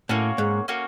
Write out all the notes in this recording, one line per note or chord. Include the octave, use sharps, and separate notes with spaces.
A2 A#3 C#4 F#4
G#2
A#3 C#4 F#4